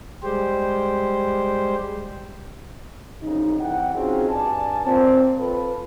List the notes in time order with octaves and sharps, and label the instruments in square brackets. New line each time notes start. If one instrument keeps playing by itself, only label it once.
[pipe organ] G3 G#3 G4 C5
[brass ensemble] C2 F#2 C#3 D#4
C2 E3 F#5 G5
C4 C#4 D#4 F4 F#4 G#4
G2 D5 G#5 A5
A#2 C4
F4 A4 B4